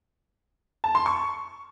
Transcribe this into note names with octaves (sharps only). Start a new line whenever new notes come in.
A5
C6
C#6